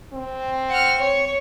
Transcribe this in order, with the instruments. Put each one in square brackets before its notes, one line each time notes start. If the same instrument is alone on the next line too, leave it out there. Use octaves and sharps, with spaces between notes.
[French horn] C4
[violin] F#5 F6
C#5